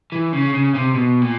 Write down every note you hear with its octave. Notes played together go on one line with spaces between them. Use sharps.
E3
C#3
C#3
C3
B2
A#2